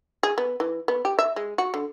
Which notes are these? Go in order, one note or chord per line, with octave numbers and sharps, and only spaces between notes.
G#4
B3
E3
B3
G4
E5
G#3
F#4
D3